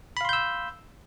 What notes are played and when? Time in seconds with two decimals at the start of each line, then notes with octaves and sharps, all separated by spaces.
0.17 B5
0.21 F5
0.25 C6
0.29 G6
0.33 E6